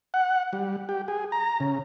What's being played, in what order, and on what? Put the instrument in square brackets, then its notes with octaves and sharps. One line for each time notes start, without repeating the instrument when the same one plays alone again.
[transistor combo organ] F#5
G3
G4
G#4
A#5
C#3